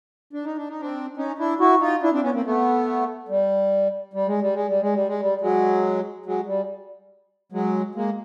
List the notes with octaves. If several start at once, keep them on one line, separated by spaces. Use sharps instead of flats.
D4
D#4
D4
D#4
C4 D4
C#4 D#4
D4 E4
E4 F#4
D#4 F4
D4 E4
C4 D4
B3 C#4
A#3 C4
A3 B3
G3
G3
G#3
G3
G#3
G3
G#3
G3
G#3
G3
F#3 G#3
F#3 G#3
G3
F#3 G#3
G#3 A#3